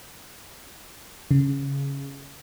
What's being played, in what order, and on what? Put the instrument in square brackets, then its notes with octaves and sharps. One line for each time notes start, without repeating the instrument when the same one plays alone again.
[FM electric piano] C#3